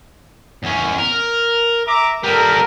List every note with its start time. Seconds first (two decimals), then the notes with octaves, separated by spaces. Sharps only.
0.64 E2 C#4
0.99 A#4
1.86 E5 A#5 D6
2.23 G3 B3 A4 A#4